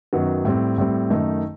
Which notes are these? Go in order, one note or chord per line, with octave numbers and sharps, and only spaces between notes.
F#2 D#3 F#3 B3
A2 G3 C4
A2 G3 C4
F#2 D#3 A3 D#4